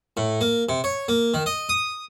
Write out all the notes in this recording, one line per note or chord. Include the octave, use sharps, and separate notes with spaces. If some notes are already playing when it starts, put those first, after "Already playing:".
A2
A#3
C3
C#5
A#3
D#3
D#5
D#6